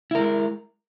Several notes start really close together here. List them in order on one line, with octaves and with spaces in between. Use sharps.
E4 A#4 G#3